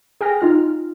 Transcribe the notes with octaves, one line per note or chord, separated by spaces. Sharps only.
G#4 G5 G#5 F6 A#6
D#4 F4 F6